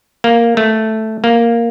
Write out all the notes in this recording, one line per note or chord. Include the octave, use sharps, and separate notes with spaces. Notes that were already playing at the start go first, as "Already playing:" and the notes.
A#3
A3
A#3